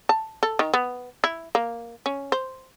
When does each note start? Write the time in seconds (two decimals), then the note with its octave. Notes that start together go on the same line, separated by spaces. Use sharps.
0.09 A5
0.43 A4
0.59 D#3
0.74 B3
1.24 E4
1.55 A#3
2.06 C#4
2.32 C5